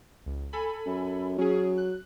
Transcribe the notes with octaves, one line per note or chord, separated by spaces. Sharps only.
C#2
A4 G#5 B5
F#2
F#3 C#4 G#4
F#6